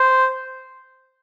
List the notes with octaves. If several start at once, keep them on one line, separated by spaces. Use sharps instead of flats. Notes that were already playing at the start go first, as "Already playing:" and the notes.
Already playing: C5